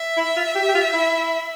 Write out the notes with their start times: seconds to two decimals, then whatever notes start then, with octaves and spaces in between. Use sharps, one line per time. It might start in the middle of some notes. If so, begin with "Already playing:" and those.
Already playing: E5
0.17 E4
0.37 F4
0.55 G4
0.68 G4
0.75 F4
0.93 E4